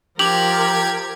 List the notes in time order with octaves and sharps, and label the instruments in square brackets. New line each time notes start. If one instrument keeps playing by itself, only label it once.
[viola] F3 A#4 [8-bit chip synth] G4 G#6 [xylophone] D6 F7 F#7